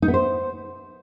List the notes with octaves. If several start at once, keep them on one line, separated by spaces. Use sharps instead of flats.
D#4
B3
C5